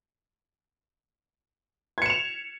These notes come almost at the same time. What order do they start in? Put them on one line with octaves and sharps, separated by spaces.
G#6 C#7 E7 F7